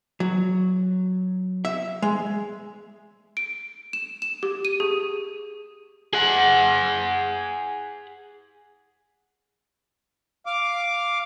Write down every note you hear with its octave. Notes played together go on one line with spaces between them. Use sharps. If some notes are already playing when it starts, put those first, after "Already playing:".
F#3
E5
G#3
D7
E7
E7
G4
D#7
G#4
G#4 F#5
F5 D6